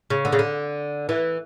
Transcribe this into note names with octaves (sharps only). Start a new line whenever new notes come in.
C#3
D3
C#3
D3
E3